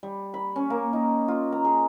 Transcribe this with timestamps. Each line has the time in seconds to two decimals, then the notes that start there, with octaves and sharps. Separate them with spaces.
0.03 G3
0.34 B5
0.56 C#4
0.70 A#3
0.93 D#4
1.28 F4
1.52 A#5
1.65 G#4